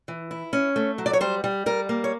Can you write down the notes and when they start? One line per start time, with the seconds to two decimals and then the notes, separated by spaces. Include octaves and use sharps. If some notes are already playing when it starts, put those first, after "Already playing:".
0.08 E3
0.31 E4
0.53 C#4
0.76 A3
0.98 F#3
1.06 D5
1.13 C#5
1.21 G3 C5
1.44 G3
1.66 G3 A#4
1.89 A#3
2.04 C#5